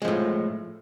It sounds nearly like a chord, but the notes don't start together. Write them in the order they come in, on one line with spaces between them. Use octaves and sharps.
G#3 F3 A2